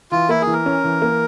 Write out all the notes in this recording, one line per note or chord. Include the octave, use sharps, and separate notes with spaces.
E3 F4
A#3 E4
G#4
E3
A#4
C#4
E3
A#3